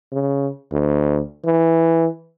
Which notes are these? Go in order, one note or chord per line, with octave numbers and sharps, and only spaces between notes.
C#3
D2
E3